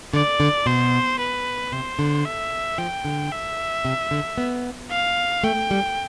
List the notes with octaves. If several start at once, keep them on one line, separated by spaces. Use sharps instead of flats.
D3 D5
D3
B2 C5
B4
C3 C5
D3
E5
F3 G5
D3
E5
C3
D3
B3
F5
A3 G5
G3